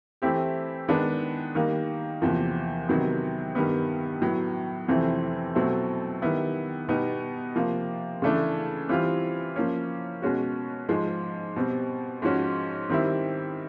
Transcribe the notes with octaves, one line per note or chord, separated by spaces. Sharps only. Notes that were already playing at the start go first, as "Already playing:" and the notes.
E3 A3 C4 E4 G4
D#3 G#3 B3 D4
D#3 G3 A#3
E2 C3 F3 A#3
C3 D#3 F#3 B3
G2 D#3 G3 B3
A2 F#3 B3
F2 C3 E3 A3 C4
B2 F#3 A3 C4
D#3 G3 B3 E4
B2 G3 B3 D#4
C3 F3 A#3
C#3 E3 A3 D4
E3 G3 C4 F4
F3 A#3 C#4
B2 G#3 C#4 F#4
G#2 F3 G#3
B2 G3 C4
G#2 F3 G#3 C#4 F#4
D#3 G3 C4 E4